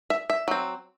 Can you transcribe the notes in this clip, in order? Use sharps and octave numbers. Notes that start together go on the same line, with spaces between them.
E5
E5
F#3 C4